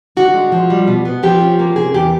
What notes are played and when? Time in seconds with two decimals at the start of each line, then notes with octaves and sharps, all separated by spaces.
0.17 D3 F#4
0.34 G#3
0.52 F3
0.70 G3
0.87 B2
1.05 B3
1.23 F3 G4
1.41 C#4
1.59 A#3
1.76 C3 G#4
1.94 E2 G4